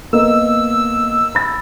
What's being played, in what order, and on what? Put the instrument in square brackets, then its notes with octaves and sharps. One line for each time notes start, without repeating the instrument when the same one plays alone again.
[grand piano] A#3 B3 D#5 [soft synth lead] E6
[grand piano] B5 A6